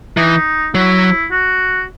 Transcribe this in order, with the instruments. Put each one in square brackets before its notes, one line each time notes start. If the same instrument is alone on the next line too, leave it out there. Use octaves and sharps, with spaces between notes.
[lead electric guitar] E3 [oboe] D#4
[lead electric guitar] F#3 [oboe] E4
[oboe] F#4